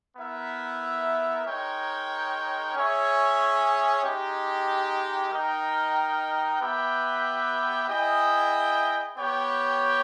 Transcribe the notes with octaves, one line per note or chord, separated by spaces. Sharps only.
B3 E4 A#4 E5
G#3 D#4 A#4 C#5 G5
C#4 G#4 C#5 E5
G#3 D#4 G4
D#4 A#4 D#5 G5
B3 G4 B4 E5 G5
E4 G#4 D#5 G5
B3 G4 C#5 G5